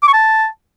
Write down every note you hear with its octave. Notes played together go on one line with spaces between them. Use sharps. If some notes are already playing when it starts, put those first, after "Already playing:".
D6
C#6
A5